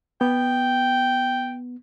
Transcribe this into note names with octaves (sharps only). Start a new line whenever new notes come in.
B3 G5